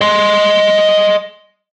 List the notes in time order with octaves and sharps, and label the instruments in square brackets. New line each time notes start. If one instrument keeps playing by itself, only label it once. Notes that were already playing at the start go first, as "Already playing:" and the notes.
[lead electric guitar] D#5 C6